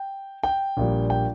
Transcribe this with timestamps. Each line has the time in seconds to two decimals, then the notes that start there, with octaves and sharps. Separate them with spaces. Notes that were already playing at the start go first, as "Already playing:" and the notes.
Already playing: G5
0.43 G5
0.77 A#1 A#2 G3
1.10 G5